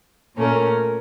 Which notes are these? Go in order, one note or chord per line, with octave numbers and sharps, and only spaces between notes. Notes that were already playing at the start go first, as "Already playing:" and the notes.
A#2 A3 C#4 A#4